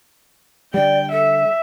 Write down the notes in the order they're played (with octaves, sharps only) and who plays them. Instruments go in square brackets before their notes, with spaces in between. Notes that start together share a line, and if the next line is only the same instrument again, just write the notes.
[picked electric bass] D3 G3 [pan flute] D5 [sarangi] G5
[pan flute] A4 [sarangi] E5